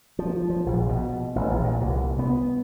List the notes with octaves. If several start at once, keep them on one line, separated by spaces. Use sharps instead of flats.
F3
F3
A#1
B2
A1
A#1
A#2
C2
B3